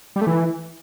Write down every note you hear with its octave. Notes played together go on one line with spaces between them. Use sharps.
G3
A3
E3